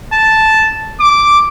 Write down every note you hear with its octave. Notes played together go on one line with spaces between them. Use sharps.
A5
D6